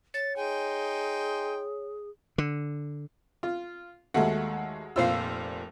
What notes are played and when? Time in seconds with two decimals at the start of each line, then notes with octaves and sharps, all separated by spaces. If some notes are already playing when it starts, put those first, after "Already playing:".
0.14 C#5 A6
0.36 D#4 G#4 G5 G#5 C6
2.38 D3
3.43 F4
4.14 D#2 G#3 A3 F#4 F#5
4.96 F1 A#2 F4 C5 F5 E6